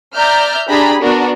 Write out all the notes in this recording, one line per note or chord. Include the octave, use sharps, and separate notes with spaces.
D5 E5 A#5 F6 G6
D4 G4 G#4 A#5 B5
B3 D4 F#4 A#4